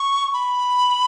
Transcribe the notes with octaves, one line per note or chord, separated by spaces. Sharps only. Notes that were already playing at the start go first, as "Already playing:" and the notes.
Already playing: C#6
B5